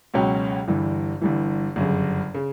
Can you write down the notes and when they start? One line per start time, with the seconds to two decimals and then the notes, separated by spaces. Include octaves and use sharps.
0.14 C#2 B2 F#3 C#4 G4
0.68 G1 G2 E3
1.22 G1 G2 E3
1.76 G1 F#2 C#3
2.34 C#3